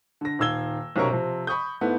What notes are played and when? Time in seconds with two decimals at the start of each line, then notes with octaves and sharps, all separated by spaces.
0.21 D3 A#6
0.39 D#1 D#3 F5 E6 G#6 G7
0.96 B1 C3 C#4 A#4 C#6
1.10 C3 F3
1.47 B5 C#6 D#6 G6
1.81 G#2 A3 B3 E4